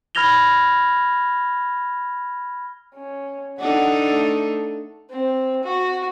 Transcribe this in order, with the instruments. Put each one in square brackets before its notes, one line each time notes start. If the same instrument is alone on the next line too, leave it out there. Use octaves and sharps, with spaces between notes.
[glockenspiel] B5 F6 G#6 A#6 F7 G7
[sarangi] C#4
[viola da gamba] D4 D#4 A4 [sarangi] F#5
[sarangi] A3
[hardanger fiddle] C4
F#4